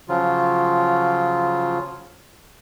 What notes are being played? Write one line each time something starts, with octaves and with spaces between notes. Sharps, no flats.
C#3 F3 F#3 F4